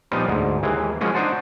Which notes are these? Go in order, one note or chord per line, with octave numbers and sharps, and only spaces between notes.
A#2 F3 G3 B3 D#4 F4
D2 G#2
D#2 E3 G#3 A#3
F3 F#3 G#3 A#3 C#4
D4 D#4 F#4 C5 F#5 A5